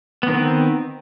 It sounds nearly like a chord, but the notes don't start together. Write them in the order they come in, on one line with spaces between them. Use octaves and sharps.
B3 D#3 C4